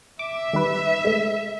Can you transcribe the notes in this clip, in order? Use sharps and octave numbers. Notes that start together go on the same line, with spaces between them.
E5 D6
D#3 G3 B4
G#3 A3